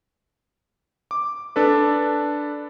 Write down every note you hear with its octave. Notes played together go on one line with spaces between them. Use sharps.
D6
D4 A4 B4